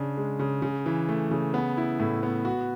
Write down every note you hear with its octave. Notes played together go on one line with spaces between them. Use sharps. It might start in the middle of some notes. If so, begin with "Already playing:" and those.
Already playing: C#3 D4
G#3
C#3
C#3
E3
A3
C#3
B3
E4
A2
B3
F#4